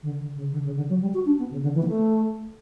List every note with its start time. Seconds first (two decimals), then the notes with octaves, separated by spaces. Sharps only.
0.03 D3
0.20 D3
0.35 C#3
0.52 D3
0.65 C#3
0.76 D3
0.89 F#3
1.01 G3
1.14 F#4
1.26 D4
1.38 B3
1.51 C#3
1.62 D3
1.75 E3
1.83 B3
1.87 A3